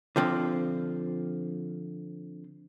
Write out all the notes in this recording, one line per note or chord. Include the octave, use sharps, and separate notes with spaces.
D3 F3 C4